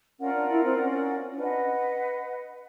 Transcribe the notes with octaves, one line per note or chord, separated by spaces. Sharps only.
C#4 F4 A#4 D5 F#5
D4
E4
C4
C#4
C#4
D4 B4 D#5 F#5